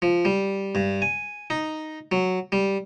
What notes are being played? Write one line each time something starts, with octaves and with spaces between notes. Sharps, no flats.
F3
G3
G2
G#5
D#4
F#3
G3